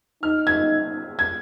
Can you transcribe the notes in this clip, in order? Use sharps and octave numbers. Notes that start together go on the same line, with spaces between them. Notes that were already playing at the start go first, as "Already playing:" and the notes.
D#4 F6
G#6
G#6